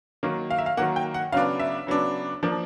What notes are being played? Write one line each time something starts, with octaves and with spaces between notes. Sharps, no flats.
D#3 F#3 A#3
F5
E5
F5
D#3 F#3 A#3 F#5
G5
F#5
C#3 F#3 B3 D4 F5
E5
C#3 F#3 B3 D4
F3 A#3 D4